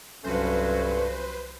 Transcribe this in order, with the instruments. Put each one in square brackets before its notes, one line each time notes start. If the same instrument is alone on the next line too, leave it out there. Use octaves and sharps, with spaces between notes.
[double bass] C2 F#3 [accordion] G2 [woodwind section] A3 C#4 F#4 [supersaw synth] B4 C5